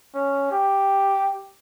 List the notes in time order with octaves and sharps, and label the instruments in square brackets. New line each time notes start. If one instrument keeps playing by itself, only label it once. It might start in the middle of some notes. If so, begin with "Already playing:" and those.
[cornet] C#4
G4